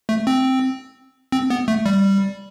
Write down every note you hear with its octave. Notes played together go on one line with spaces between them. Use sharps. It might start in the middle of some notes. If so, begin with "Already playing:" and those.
A3
C4
C4
B3
A3
G3